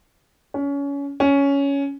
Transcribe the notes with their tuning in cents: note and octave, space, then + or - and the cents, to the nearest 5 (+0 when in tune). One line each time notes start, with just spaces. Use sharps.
C#4 +25
C#4 +10